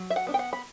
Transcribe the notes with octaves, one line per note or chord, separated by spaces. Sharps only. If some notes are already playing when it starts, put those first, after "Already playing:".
Already playing: F#3
E5
F#5
B3 D4
G5
F#5
B5